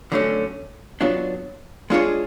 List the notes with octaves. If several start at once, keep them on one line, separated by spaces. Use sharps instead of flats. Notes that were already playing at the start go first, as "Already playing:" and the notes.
D3 F#3 A3 C#4
F#3 B3 D4 F4
G#3 D4 F4 G#4 C#5